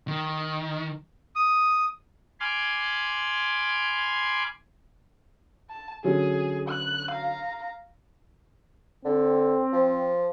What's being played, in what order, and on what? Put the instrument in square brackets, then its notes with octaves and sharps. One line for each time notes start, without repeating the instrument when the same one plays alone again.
[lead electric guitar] D#3
[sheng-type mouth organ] D#6
[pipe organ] G#5 B5 C6 D6 F6 G#6
[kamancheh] A5
[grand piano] D3 F#3 C#4 [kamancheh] G#4
[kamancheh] F#6
F5 A#5
[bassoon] D3 [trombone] C4
[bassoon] F3